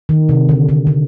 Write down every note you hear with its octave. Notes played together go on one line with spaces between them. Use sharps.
D#3
C3
D3
D3
D3